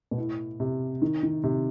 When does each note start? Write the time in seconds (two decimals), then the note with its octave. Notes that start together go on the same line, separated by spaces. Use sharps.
0.11 B2
0.18 A2
0.60 C3
1.02 D#3
1.23 D#3
1.43 C3